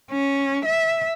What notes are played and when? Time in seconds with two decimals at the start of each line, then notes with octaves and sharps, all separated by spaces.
0.12 C#4
0.65 E5